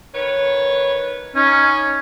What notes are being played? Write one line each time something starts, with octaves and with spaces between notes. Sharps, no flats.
D#3 B4 C#5
C#4 D#4